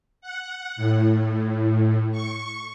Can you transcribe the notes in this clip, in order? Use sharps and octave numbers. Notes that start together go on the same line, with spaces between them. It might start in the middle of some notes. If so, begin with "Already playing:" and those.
F#5
A2
C#6